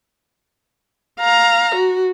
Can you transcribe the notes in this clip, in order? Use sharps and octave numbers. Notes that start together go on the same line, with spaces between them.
F5 A#5
F#4